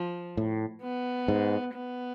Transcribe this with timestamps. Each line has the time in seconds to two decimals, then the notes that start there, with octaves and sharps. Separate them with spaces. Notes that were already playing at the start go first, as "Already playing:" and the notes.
Already playing: F3
0.37 A2
0.82 B3
1.28 G#2
1.74 B3